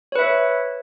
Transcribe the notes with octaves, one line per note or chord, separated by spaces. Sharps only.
B4 C#5 E5